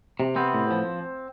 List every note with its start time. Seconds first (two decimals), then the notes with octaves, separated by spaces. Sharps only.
0.20 C3
0.36 B3 C4
0.54 A2
0.71 F3